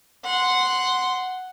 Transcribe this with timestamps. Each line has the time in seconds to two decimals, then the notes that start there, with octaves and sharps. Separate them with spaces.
0.25 F#5 C6